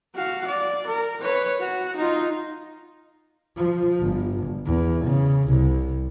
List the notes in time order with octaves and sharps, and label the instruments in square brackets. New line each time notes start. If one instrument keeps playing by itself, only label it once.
[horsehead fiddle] F#4 F5
D5
A#4
B4 C#5
F#4
D#4 F4
[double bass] F3
G1
E2
C#3
C2